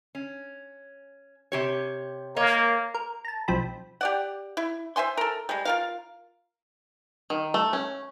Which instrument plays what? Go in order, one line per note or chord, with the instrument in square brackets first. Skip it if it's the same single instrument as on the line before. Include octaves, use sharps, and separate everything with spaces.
[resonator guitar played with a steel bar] C#4
C3 G4 C#5
[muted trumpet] A#3 [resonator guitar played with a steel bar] A#4 C#5 D#5
[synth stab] A#4
A5 A#5
B1 F3 C4 B5
[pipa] G4 D5 F#5
E4
C5 E5 G#5 C6
A4 A#4
G3 G#3
F4 A#4 F5
[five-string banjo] D#3
A3
C#4